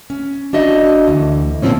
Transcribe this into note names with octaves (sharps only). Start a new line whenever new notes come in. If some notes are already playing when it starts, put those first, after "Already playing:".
C#4
D4 F#4 D#5 E5
D2 E3
D#2 A#2 D#3 F3 C4 C#4